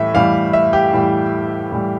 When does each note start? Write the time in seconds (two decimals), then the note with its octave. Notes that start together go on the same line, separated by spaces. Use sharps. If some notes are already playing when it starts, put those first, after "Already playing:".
Already playing: A2 E3 G3 E5
0.14 A2 E3 G3 F5
0.53 E5
0.73 G4
0.93 A2 E3 G3
1.72 A2 E3 G3